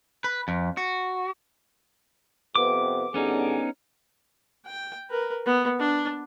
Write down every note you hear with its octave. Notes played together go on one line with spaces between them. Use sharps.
B4
F2
F#4
F2 C3 B3 D6
D3 G3 B3 C#4 D#4 G#4
G5
A#4 B4
B3
D4